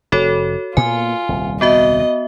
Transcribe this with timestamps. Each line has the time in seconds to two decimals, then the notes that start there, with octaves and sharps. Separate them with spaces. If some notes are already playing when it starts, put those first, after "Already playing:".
0.12 F1 F#4 A4 C#5
0.77 A#2 A#3 B3 F4 G#5
1.29 D#1 C2
1.61 B3 F#4 D#5 E5